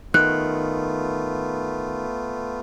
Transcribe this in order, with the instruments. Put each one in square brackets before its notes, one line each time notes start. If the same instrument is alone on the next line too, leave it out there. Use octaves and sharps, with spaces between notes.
[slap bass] D#3 [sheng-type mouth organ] A3 B3 F4 [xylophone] F#6